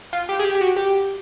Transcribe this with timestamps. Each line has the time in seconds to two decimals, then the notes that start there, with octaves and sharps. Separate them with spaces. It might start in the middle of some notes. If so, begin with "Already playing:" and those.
0.13 F4
0.29 G4
0.39 G#4
0.44 G4
0.55 G4
0.61 F#4
0.77 G4